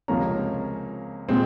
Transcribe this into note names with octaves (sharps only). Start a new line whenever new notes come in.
C#2 C3 F3 A#3 C#4 A#5
A#2 G#3 C4